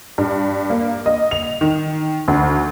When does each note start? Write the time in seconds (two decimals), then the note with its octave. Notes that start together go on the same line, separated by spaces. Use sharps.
0.18 G2
0.70 A#3
1.06 D#5
1.31 F7
1.61 D#3
2.28 D2